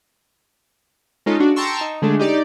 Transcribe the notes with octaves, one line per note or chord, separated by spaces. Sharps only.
G#3 C#4 D#4 F4 A4
D4 F#4
G5 A5 A#5 C6 C#6 E6
D#4
D3 G#3 A3 D4
D#4 G4 D5